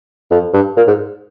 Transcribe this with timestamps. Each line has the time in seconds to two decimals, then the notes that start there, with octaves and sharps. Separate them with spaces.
0.31 F2
0.53 G2
0.77 A#2
0.87 G#2